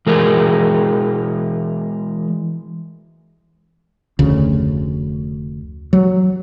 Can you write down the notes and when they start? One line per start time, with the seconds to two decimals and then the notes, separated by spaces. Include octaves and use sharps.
0.07 E3 G#3 A#4
4.19 F1 D2 C#3
5.93 F#3